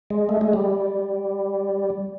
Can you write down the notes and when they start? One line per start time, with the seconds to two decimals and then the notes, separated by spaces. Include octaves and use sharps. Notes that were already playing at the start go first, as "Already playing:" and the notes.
0.10 G#3
0.29 A3
0.41 G#3
0.53 G3